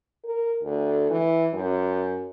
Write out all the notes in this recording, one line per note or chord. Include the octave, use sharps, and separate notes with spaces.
A#4
D2
E3
F#2